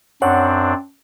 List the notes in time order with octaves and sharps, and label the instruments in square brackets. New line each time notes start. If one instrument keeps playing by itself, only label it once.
[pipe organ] F#2 C4 D4 [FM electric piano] C#5 F#5